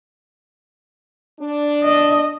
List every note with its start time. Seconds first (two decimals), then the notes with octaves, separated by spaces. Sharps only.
1.40 D4
1.83 D#5